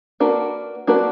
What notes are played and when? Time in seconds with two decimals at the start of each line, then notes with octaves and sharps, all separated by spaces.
0.20 A#3 D4 F#4 B4
0.87 A#3 D4 F#4 B4